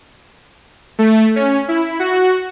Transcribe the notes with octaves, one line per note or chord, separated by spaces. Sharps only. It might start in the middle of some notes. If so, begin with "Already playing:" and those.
A3
C#4
E4
F#4